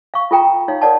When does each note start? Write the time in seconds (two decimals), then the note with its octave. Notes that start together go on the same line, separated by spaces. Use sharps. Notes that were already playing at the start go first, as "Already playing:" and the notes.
0.14 F5 C#6
0.31 F4 A4 G5 A#5
0.68 D#4 C#5 F5
0.82 A4 A#4 C#5 D5 F#5 A5